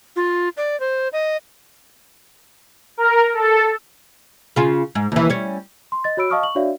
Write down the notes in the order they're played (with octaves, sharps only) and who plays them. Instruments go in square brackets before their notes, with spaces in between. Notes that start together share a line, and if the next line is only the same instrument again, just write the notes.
[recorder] F4
D5
C5
D#5
[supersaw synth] A#4
A4
[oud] C#3 F4
G#2
D#2 E3
G3 C#4
[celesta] C6
D#5 A6
F#4 C#5 B5 E6 D7
D#5 F5 A5 C#6 D#6 F6
C#6 F#7
D4 F#4 C#5 D5 E5 F5